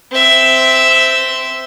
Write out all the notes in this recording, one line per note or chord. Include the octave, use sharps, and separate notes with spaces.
C4 E5